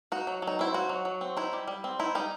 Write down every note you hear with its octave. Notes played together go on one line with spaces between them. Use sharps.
D#4 F#4
F#3
F#3
D#4
C4 E4
D#4 F#4
F#3
F#3
C4
D#4 E4
G3
G3
C4
D#4 E4
G3 D#4